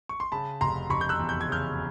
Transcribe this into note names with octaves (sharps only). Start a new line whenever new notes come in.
C#6
C6
C#3 A5 B5
F1 A#5 C6
F1 B5 C#6
G6
E6 F#6
E2
G6
G#6
C#3 F6 G6